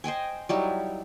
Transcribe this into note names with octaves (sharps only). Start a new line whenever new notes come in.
C5 D#5 G5 G#5
F#3 G3 D#4 E4